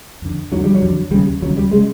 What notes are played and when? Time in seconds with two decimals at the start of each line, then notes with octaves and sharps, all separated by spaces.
0.22 F2 D3
0.52 F2 D3 F#3
0.64 G3
0.75 F#3
0.82 F2 D3
1.11 D#2 G3
1.14 C#3
1.42 D#2 F#3
1.45 C#3
1.57 G3
1.72 G#3
1.75 C#3